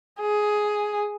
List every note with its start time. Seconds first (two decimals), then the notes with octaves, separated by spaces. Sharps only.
0.21 G#4